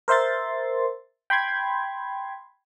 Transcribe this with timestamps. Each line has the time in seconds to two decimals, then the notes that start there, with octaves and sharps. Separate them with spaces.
0.08 A#4 C5 E5 C6 A6
1.30 G5 B5 C6 G#6